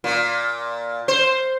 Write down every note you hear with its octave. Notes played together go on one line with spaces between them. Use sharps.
A#2
C5